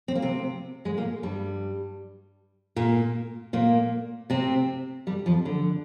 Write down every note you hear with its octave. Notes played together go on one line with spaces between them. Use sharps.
C4
A#3
C3 C4
G#2 G#3
A#2 A#3
G2 G3
A#2 A#3
A#2 A#3
C3 C4
G2 G3
F2 F3
D3